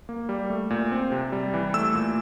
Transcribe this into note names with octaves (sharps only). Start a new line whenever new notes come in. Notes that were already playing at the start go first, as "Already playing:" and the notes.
A#3
G3
A3
A#2
C4
C3
G3
E3
A3 E6
A#2